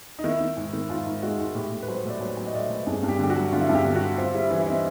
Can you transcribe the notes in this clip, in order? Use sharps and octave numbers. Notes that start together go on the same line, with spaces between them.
D#4
D#3 E4
D#3
G#2
D#3
G#2 F4
G#2
G#3 F#4
G#2
A2 G4
A2
B4
F#3 C5
A2 D5
F#3 C#5
F#3
D#5
A2 D5
A2
G2 G#4
G2
G4
D3 G4
F#4
F#3
D3 F4
E4
F4
G2
G4
D3
F#4
D3
C4 F4
G3 E4
E3 E4
E4
C4 D#4